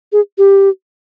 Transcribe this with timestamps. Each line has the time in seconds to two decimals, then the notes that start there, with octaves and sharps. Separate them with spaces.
0.12 G#4
0.38 G4